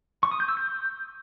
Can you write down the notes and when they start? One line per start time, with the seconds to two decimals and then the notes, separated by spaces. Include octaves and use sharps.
0.23 C#6
0.31 D#6
0.40 G6
0.48 E6
0.57 G6